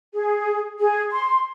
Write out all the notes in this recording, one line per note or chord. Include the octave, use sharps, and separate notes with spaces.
G#4
G#4
C6